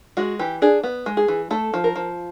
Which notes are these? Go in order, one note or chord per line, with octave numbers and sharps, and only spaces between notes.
G#3 F#4
E3 G4
D4 G#4
B3
G#3
G#4
E3
A3 A4
F3
A#4
F3